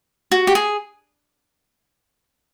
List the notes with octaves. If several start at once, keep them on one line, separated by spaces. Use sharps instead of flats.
F#4
G4
G#4